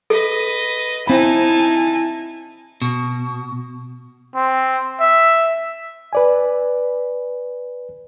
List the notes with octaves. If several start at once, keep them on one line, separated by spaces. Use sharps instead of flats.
A4 B4 D#5
C4 D#4 E4 G#5 A5 B5
B2
C4
E5
B4 D5 G#5